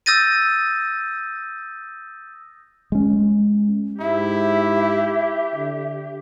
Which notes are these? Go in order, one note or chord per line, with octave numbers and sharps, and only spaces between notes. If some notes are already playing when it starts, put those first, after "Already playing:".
D#6 E6 G6 A6 A#6 D#7
G#3 C#4
G#2 E4 G4 E5
D3